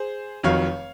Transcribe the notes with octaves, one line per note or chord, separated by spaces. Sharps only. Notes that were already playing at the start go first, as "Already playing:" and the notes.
Already playing: G#4 C5
F1 F2 D#3 F#3 C#5 F5